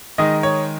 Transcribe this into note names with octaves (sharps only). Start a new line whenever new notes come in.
D#3 G#3 D#4 D#5
C#5